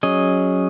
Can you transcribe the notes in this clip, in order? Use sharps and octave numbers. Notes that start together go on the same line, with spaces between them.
F#3 C#4 G#4 D#5